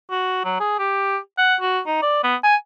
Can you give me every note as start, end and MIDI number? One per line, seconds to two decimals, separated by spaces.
0.11 0.40 66
0.45 0.59 54
0.60 0.75 68
0.79 1.17 67
1.38 1.56 78
1.61 1.80 66
1.87 1.98 63
2.02 2.20 74
2.23 2.36 59
2.44 2.56 80